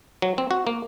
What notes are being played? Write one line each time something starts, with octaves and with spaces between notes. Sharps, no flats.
F#3
C4
F#4
A#3